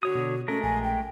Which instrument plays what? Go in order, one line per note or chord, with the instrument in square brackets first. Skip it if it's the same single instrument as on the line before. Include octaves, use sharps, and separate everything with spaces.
[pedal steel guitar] D3 C#5 D#6 [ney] F#4
[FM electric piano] B2
[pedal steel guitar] G#3 A3 A#4 [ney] C#4 [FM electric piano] A4
[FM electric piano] A#1 [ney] G#5
[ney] G5